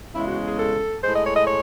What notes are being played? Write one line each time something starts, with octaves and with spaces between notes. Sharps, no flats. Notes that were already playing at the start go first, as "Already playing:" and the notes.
E2 C#3 G#3 E4
F#4
G#4
A4
A2 G#3 C5
D#5
C#5
D#5
C#5